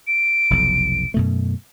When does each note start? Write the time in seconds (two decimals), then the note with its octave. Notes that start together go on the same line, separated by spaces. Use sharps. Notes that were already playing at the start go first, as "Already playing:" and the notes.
0.07 D7
0.50 F1 B1 F2
1.14 F#2 B2 A3